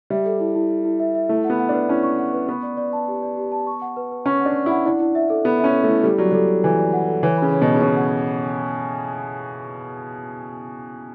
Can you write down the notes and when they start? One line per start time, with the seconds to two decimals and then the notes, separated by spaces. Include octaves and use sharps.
0.10 G3 E5
0.26 A4
0.40 E4
0.55 E4
0.71 E4
0.85 E4
1.00 E5
1.15 E5
1.29 A3 E4
1.44 F#5
1.50 B3
1.59 F#5
1.69 D4 B4
1.89 C#4 E4
2.03 C#6
2.19 F#5
2.33 B4
2.48 B3 C#6
2.63 D5
2.77 D5
2.93 A5
3.08 G4
3.22 D5
3.37 G4
3.52 A5
3.67 C#6
3.82 F#5
3.97 B4
4.12 B4
4.26 C#4 C#6
4.40 F#5
4.46 D4
4.56 C#6
4.66 E4 F#5
4.86 D4 E4
5.00 E4
5.15 E5
5.30 A4
5.45 B3 A4
5.59 C#4 E5
5.74 A4
5.84 A3 E4
6.04 G3 A4
6.18 F#3 D5
6.32 G3 A4
6.48 A4
6.64 E3 A4
6.78 D5
6.93 F#5
7.08 A4
7.23 E3 C#5
7.38 C#3 B5
7.53 C#5
7.62 B2
7.67 C#5
7.74 C#3
7.82 B2 C#5
7.96 F#5